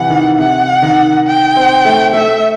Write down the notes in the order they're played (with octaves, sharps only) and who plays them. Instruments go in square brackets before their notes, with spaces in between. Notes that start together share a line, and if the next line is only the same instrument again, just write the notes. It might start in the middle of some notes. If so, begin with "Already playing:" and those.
Already playing: [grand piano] C3 E3 G3 [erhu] F#5
[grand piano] D#3
[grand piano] C3 [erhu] F#5
[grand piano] D#3
[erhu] G5
[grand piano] C4
A3
[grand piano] A3 [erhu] E5